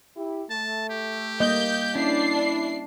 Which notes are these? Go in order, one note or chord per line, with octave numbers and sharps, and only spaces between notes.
E4 G4
A3 A5
G4
G3 A#3 D#5 G6
C#4 D4 E4 C7